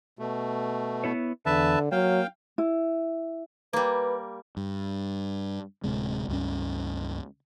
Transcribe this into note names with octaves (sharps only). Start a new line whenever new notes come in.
B2 A3
B3 E4 C#5
E2 D3 B4 E5 A5
F#3 A#3 F5 G5
E4
G3 A#3 B4
G2
D1 C3 G#3
C#2 G2 C#4